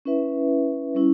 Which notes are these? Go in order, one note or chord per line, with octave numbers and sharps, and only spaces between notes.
C#4 E4 B4 E5
G3 C#4 E4